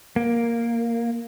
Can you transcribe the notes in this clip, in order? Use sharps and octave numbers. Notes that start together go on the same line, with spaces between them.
A#3